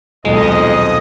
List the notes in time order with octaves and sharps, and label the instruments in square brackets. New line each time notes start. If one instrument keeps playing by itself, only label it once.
[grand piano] D#1 B1 A4 [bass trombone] F2 [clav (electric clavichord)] G#3 [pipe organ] D#5